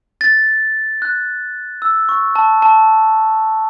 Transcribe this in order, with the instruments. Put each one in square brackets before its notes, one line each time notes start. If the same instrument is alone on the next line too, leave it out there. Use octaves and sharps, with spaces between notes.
[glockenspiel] A6
F#6
E6
C#6
A5
A5